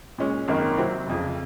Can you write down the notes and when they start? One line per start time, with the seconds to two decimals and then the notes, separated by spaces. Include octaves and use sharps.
0.18 A#2 G#3 C#4
0.48 G#1 F#2 D#3 A#3
0.78 C3 F#3 C4 F#4
1.07 F1 F2 C#3